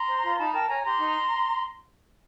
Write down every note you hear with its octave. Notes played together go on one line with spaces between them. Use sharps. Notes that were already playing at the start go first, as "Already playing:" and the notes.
Already playing: A#5 C6
C5
F4
D#4 A5 B5
A#4 G5 A5
C#5 G#5 A#5
G4 A#5 C6
D#4